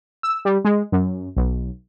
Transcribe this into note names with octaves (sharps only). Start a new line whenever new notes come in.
E6
G3
G#3
F#2
B1